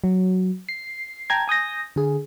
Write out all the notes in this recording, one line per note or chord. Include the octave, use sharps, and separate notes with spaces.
F#3
C7
G5 A5 A#5 G#6
G#5 D#6 G6 A#6
D3 G#4